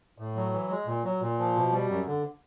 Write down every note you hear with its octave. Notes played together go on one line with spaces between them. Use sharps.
A2
F#3
E3
G#3
A#2
F#3
A#2
F3
B2
G3
F#2
D3